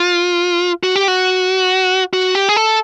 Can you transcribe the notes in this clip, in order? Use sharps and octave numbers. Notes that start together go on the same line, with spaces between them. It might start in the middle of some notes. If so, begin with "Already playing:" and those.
Already playing: F4
F#4
G4
F#4
F#4
G4
G#4
A4